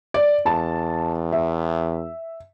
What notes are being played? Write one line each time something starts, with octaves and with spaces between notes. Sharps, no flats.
D5
E2 A5
E5